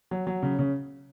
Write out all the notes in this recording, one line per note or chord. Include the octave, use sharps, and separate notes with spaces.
F#3
F#3
C#3
C#3